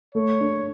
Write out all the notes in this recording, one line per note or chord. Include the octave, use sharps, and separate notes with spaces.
A3 C#5
D4